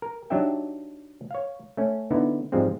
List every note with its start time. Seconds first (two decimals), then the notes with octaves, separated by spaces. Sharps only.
0.02 A#4
0.30 F#3 D4 D#4 G4 E5 G5
1.31 C#5 F5
1.77 A3 C#4
2.11 D3 B3 D#4 E4
2.52 G#2 F3 G3 G#3 C4